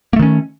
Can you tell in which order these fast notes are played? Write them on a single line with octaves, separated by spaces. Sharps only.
A#3 A3 D#3 C#4